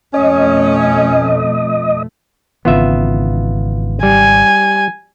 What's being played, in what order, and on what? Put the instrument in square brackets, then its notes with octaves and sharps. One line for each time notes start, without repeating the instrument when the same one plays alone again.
[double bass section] F2 B2 A3 [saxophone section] C#4 [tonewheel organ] D#5
[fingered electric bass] G#1 C#3 E3 [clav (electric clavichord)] B3 F4 E5
[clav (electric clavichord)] G3 [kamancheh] G#5